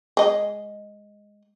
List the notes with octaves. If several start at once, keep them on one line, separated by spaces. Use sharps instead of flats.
G#3 D#5